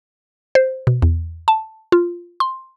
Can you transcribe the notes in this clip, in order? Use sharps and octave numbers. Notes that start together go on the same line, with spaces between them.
C5
B2
E2
A5
F4
C6